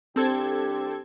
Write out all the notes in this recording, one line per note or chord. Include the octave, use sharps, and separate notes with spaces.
C2 C4 D4 G4 A4 G#6